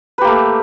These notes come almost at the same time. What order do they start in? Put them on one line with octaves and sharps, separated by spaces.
B4 G4 A#3 A3